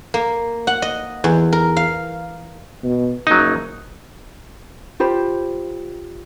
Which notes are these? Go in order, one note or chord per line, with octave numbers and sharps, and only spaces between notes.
A#3
F#5
D#5
E2
A#4
F5
B2
F#1 F#3 D#4
F4 G4 C5 B5